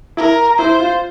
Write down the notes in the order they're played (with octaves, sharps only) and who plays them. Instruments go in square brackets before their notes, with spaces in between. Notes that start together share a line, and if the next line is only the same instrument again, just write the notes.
[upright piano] E4 [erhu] A#4
[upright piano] E4 [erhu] C5
[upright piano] F4